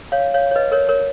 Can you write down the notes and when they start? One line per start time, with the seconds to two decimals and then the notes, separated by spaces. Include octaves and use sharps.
0.12 C#5 F5
0.34 C#5 F5
0.51 C#5
0.56 B4 D#5
0.72 A#4 C#5
0.89 A#4 C#5